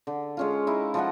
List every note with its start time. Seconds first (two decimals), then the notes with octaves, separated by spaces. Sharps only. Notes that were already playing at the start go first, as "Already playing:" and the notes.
0.07 D3
0.37 G#3 C#4 F4
0.67 D#4 E4
0.94 F3 A4 D#5 F#5